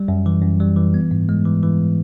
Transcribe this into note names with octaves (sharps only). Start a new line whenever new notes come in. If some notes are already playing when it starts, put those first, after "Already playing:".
Already playing: G3
F#2
E3
F#2
G3
E3
B3
G#2
G#3
E3
E3